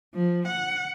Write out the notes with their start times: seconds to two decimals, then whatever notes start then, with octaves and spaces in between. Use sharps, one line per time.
0.15 F3
0.47 F#5